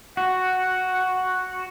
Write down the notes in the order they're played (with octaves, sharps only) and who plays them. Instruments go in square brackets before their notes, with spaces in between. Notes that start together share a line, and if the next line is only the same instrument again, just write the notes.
[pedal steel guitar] F#4 [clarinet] F#5